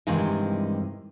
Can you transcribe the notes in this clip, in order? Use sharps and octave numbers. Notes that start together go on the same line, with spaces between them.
G2 C3 D#3 E3 G#3